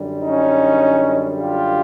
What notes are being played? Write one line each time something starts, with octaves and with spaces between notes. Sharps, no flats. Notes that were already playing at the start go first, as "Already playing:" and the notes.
Already playing: F#2 D3 G3
C#4 D#4
F4 G4